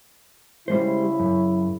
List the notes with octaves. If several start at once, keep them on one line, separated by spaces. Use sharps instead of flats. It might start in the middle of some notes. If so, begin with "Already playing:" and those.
C#3 G3 G#3 E4 C5
F#2